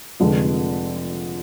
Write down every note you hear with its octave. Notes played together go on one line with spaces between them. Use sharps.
F1 F2 D3 F3 G#3